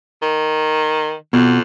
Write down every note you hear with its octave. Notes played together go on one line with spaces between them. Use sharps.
D#3
F2 B2